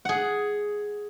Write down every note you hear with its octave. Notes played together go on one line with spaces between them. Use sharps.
G#4 F#5